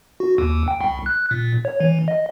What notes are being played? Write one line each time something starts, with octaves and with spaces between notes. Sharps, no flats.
F#4
D#2
G5
C2
F#6
A#2
C#5
E3
D#5